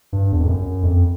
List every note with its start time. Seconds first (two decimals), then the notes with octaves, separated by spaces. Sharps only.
0.13 G2
0.32 E2
0.40 F2
0.47 F#2
0.83 F2